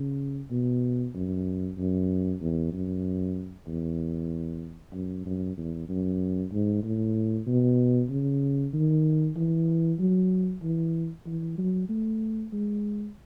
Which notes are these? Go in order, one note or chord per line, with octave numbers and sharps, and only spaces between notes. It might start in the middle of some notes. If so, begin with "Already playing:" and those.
Already playing: C#3
B2
F#2
F#2
E2
F#2
E2
F#2
F#2
E2
F#2
G#2
A2
B2
C#3
D#3
E3
F#3
E3
E3
F#3
A3
G#3